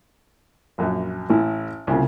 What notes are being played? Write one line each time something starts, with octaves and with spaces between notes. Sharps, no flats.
A#1 F#2 F#3
A1 A2 E4
C2 A#2 C#3